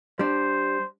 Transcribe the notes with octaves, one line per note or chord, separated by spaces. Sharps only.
G3 D4 C5